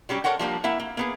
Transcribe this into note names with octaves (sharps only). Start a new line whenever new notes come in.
F#3 G3 C#4 G4
A4 A#4 C5 C#5 F#5 G5
F3 G3 A#3 D4
A#3 E4 E5 F#5
A#3
A#3 B3 G#4